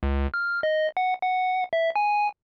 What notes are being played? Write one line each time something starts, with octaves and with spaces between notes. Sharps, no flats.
C#2
F6
D#5
F#5
F#5
E5
G#5